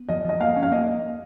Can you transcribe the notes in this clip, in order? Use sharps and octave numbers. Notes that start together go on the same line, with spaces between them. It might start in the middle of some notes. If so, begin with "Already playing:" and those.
Already playing: B3
F3 D#5
F3 D#5
A#3 F5
C#4
F5
A#3 D#5